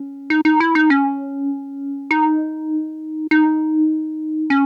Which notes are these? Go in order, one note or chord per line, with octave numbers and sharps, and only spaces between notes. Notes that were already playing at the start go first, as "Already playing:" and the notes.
Already playing: C#4
D#4
D#4
E4
D#4
C#4
D#4
D#4
C#4